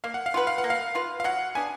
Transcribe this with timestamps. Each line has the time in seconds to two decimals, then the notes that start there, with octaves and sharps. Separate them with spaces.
0.04 A#3 F5
0.14 F#5
0.26 F5
0.34 F4 B4 F#5
0.47 F5
0.58 F#5
0.64 A#3
0.70 F5
0.95 F4 B4
1.20 F5
1.24 F#3 F#5
1.55 B3 D4 G#4 G#5